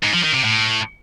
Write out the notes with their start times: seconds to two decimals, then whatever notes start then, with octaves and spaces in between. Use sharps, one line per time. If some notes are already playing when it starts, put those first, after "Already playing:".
0.03 G#2
0.14 F3
0.24 D#3
0.34 C3
0.44 A2